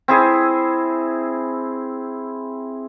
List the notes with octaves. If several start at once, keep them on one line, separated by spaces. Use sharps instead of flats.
C4 E4 G#4